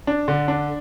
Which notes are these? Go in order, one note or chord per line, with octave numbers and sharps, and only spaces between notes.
D4
D3
D4